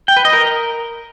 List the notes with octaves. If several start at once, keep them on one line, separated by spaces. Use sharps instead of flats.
G5
B4
D#5
A#4